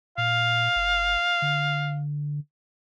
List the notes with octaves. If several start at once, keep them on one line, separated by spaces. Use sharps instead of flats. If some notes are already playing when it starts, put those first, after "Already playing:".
A#2 F5
G1
D3